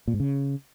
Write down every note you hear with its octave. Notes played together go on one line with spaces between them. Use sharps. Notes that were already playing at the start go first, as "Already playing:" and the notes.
A#2
G#2
C#3